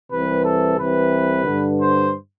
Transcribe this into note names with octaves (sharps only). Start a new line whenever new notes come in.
C2 C3 E3 B4
A4
C2 C3 E3 B4
G2 D3
C5